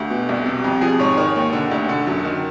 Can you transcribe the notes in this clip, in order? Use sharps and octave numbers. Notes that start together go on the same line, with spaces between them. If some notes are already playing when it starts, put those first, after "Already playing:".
Already playing: D2 G4
B2
C2
C3
F2
F3 G#4
G#2 C#5
D#3 C#5
D#2
D3
D2
D3
F#2
D#3